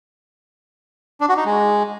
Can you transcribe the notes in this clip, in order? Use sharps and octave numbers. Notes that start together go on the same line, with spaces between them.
D4
F#4
D#4
G#3